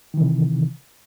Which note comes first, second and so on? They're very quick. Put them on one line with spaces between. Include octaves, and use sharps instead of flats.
D#3 E3 C3